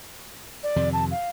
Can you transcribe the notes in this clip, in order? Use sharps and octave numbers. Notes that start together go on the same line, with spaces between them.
D5
F2 C3 D#3
A5
F5